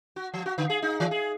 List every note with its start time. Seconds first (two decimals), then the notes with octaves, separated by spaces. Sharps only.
0.16 F#4
0.34 F3
0.46 F#4
0.58 D3
0.70 G#4
0.82 D#4
1.00 E3
1.11 G#4